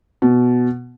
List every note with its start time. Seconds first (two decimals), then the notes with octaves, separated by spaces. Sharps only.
0.22 B2